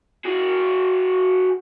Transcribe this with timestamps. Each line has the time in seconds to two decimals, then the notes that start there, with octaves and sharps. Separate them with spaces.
0.25 F#4 G#4